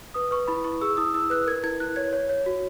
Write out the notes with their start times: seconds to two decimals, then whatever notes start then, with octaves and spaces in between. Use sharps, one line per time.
0.14 B4 D#6
0.31 B4 C#6
0.47 E4 B5
0.64 E4 C#6
0.81 G#4 E6
0.97 E4 D#6
1.14 E4 E6
1.30 B4 F#6
1.47 A#4 G#6
1.64 E4 G#6
1.80 E4 F#6
1.96 C#5 G#6
2.13 C#5
2.29 C#5
2.46 F#4